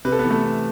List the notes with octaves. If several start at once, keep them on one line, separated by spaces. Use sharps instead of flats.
C3 B4
A4
B3 B4
E3
A3 A4
B3